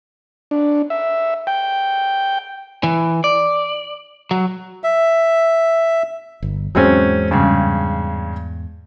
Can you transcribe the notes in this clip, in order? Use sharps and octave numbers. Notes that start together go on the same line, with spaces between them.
D4
E5
G5
E3
D5
F#3
E5
G1
E2 G#2 F#3 G#3 C4 C#4
G2 C#3